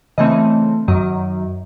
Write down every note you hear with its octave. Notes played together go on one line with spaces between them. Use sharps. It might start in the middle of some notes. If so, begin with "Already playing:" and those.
C#3 E3 A3 C4 D#5
F#2 D#3 F#3 D#5